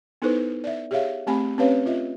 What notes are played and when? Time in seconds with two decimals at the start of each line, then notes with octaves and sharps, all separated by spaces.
0.22 B3 D#4 E4 A4 B4 C5
0.64 D5 E5
0.91 G4 G#4 C#5 E5 F5
1.27 A3 C4 G4 G#5 B5
1.58 C4 C#4 G4 B4 C#5 F5
1.86 F4 D#5 E5